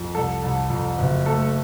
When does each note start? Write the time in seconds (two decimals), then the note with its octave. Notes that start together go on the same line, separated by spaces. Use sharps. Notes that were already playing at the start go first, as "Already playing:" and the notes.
Already playing: F2
0.15 C2 A4
0.43 C2
0.70 F2
0.98 F#1
1.26 A3 A4